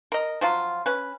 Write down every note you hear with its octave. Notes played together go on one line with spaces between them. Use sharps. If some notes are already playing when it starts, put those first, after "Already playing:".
A#4 D#5
F3 F#3 F4
C#4 B4